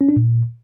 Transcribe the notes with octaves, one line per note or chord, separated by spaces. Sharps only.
C#4
D4
A#2